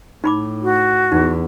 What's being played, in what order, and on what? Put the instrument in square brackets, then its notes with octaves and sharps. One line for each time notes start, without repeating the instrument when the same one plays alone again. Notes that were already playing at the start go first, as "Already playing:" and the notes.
[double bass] A2 [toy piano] D#4 B5 D6
[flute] F#4
[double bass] E2 [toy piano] D#4